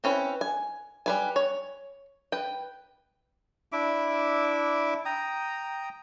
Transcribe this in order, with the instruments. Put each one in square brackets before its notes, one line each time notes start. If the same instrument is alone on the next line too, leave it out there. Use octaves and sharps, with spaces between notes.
[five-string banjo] C4 C#4 E4 B4
G#5
G3 B4 G#5
C#5
B4 G5
[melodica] D4 E4 E5 D6
G5 A#5 D#6